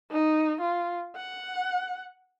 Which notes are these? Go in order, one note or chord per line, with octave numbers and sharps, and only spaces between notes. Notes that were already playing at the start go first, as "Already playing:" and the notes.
D#4
F4
F#5